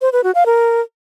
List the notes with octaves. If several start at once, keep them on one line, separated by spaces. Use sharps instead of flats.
C5
B4
F#4
F5
A#4